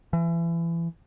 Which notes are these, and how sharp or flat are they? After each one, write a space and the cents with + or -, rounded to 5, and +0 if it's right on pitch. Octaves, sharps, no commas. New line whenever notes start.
E3 +30